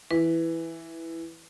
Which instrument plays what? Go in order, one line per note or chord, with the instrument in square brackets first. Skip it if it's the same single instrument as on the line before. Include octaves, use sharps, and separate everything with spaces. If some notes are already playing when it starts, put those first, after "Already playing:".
[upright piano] E3 [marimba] B4